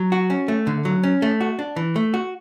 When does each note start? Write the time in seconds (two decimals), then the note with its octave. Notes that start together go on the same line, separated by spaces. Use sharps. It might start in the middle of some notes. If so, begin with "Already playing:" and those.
Already playing: F#3
0.12 F#4
0.30 C#4
0.48 A3
0.67 D3
0.85 F#3
1.03 C#4
1.22 A3
1.41 F#4
1.59 D4
1.76 E3
1.96 A3
2.14 F#4